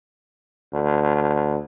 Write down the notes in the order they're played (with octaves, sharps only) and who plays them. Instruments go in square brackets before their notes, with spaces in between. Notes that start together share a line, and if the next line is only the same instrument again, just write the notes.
[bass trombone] D2